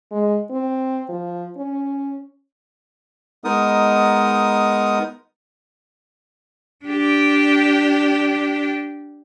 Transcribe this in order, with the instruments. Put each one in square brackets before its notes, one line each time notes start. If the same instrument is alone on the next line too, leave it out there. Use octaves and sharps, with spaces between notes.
[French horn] G#3
C4
F3
C#4
[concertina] G#3 B3 D#4 A#4 D#6
[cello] D4 G4